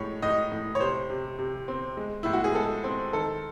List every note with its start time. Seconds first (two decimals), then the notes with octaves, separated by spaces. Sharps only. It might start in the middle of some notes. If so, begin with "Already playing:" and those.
Already playing: A2 G#3 C#5
0.22 A2 D#5
0.52 A2
0.75 C#5
0.80 C3 C5
1.10 C3
1.39 C3
1.68 C4
1.97 G#3
2.23 A2 E4
2.33 F#4
2.44 G#4
2.55 G#3 A4
2.84 C4
3.13 D#3 A4